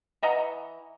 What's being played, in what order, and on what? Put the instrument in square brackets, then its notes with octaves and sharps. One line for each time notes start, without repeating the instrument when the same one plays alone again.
[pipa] E3 D#5 F#5 A#5